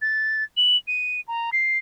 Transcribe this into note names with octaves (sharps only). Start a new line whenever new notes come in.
A6
F#7
D#7
A#5
C7